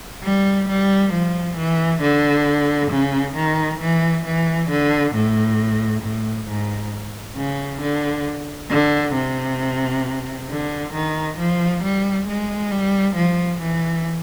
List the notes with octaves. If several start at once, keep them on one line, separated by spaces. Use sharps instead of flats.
G3
G3
F3
E3
D3
C#3
D#3
E3
E3
D3
A2
A2
G#2
C#3
D3
D3
C3
D3
D#3
F3
G3
G#3
G3
F3
E3